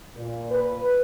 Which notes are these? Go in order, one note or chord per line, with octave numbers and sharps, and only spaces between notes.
A#2
B4